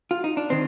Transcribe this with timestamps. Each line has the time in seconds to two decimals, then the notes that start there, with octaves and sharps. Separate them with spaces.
0.11 F4
0.24 D#4
0.37 D4
0.50 D#3 C4